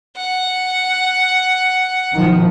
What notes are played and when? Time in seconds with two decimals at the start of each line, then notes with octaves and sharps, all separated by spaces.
0.17 F#5
2.14 B2 D#3 F3